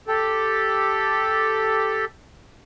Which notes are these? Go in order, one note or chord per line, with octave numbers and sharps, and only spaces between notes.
G4 A4